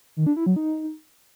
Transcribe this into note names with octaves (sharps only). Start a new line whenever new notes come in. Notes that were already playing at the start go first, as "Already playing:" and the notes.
D#3
D4
E4
F#3
D#4